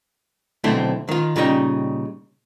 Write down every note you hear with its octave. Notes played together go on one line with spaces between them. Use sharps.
B1 D3 A3 C4 E4
D#3 F4
A#2 C#3 G3 D#4 D#5 G5